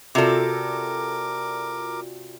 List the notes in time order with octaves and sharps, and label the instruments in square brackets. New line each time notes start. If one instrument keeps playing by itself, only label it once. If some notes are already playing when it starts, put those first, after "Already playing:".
[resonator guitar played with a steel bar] C3 A4 [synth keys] F4 F#4 D5 [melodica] A#4 D6